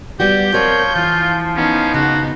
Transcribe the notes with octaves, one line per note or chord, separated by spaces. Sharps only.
G3 B3 F#4 G4 D5 G6
F3 C4 A#4 C#5 D5
E3 F4
B3 C#4 D#4
C#3 F#4